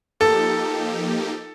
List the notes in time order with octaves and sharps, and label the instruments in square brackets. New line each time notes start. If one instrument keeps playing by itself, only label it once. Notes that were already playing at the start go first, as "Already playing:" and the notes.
[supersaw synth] F3 A#3 D#4 G4 [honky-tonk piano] A4